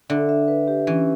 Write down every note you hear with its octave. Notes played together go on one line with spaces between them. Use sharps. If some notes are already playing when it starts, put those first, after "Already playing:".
D3 E5
E5
B4
G4
E3 C#4